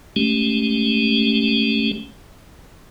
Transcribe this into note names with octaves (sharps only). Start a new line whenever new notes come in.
G#3 A3 C#4 G4